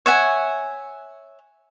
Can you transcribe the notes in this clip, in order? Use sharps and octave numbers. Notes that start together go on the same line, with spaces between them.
C#5 E5 F#5 G#5